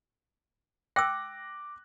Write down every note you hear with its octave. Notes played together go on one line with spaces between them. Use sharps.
G5 D6 E6 F#6 A#6